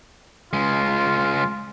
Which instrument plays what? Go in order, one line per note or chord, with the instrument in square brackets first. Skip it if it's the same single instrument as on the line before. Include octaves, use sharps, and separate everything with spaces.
[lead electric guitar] C#2 G#3 [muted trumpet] F4